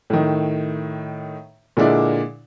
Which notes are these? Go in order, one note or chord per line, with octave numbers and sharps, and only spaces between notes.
A2 D#3
A#2 D3 G#3 D4 E4